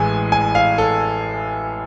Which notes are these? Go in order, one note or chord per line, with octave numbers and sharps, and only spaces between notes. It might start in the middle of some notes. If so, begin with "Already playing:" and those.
Already playing: A1 A2 E3 G#3 G#5
G#5
F5
A4